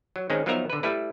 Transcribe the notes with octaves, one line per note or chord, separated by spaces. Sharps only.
F#3
D#3 G#3 C4 C#4 D#4
F3 F#3 B3 D#4 A#4 E5
D3 B4
G3 A3 E4 B4